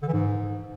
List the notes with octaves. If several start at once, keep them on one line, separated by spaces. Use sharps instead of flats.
D3
E3
G#2